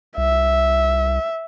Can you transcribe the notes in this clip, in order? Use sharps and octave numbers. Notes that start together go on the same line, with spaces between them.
C2 E5